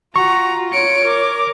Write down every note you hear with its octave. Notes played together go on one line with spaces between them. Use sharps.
F4 F#4 A#5 C#6
C#5 C#7 D7
A#4 D6